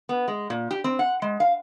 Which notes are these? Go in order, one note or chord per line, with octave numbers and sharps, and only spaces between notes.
B3
G#3
A#2
G4
C4
F#5
G#3
F5